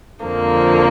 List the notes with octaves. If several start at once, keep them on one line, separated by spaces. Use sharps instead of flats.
F2 D3 F3 A#3